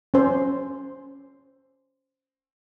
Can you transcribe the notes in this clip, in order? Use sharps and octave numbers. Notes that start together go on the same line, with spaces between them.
C#4 C5